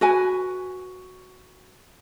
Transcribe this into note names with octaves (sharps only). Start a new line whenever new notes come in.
F#4 B4 G#5